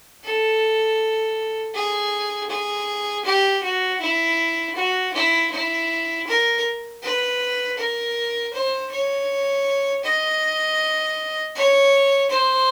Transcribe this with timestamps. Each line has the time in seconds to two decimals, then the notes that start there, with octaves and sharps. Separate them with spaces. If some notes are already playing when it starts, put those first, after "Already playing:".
0.24 A4
1.75 G#4
2.50 G#4
3.25 G4
3.63 F#4
4.01 E4
4.75 F#4
5.14 E4
5.51 E4
6.27 A#4
7.03 B4
7.78 A#4
8.53 C5
8.91 C#5
10.04 D#5
11.55 C#5
12.30 C5